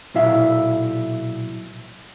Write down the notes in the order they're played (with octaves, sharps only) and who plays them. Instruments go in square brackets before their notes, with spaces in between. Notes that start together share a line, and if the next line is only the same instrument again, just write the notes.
[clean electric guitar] B1 A#2 E4 E5 F5